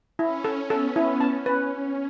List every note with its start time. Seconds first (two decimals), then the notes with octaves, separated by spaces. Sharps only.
0.19 C#4 E4
0.45 A4
0.70 B3 A4
0.96 E4
1.20 C#4 A5
1.46 B4